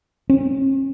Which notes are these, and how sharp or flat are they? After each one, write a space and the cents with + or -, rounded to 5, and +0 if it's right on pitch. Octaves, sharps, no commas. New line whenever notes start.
C#4 -45